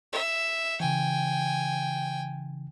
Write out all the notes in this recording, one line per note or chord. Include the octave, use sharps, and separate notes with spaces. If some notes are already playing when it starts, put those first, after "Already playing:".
E5
C#3 E3 G5 G#5